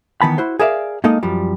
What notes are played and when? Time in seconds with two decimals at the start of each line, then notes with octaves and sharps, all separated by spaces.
0.22 D#3 E3 B3 A5 B5
0.38 E4 F#4 C5
0.59 G#4 A#4 D5 E5 F5
1.04 G#3 A#3 D#4 A4 D#5
1.23 F#2 F3 G3